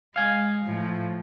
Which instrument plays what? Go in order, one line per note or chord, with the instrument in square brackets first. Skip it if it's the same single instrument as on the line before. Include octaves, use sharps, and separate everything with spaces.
[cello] G#3 [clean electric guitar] F5 G#5
[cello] A2 F3